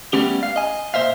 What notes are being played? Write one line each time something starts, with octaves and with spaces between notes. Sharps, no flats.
G3 A3 B3 C#4 G4
F5
D#5 G#5
A#2 C5 E5 F5